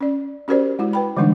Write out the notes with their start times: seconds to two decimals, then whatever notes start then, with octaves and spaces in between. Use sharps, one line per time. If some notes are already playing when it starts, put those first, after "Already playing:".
0.01 C#4 D5
0.48 C#4 F#4 G4 A#4 C5 D5
0.79 G#3 E4 F#4
0.93 B4 G5 B5
1.17 D3 E3 G3 G#3 D4 D#4